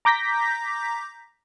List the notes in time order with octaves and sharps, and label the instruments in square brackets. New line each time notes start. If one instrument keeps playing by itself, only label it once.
[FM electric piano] A#5 D6 G6 A#6 B6